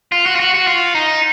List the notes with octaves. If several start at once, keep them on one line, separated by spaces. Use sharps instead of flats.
F4
F#4
F4
F#4
F#4
F4
D#4